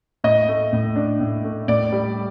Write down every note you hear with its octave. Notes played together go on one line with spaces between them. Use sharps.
A2 D#5
A3
A2
D4
A2
A3
A2 D5
G3